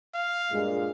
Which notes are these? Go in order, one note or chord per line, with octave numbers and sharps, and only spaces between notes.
F5
G2 A#2 G#3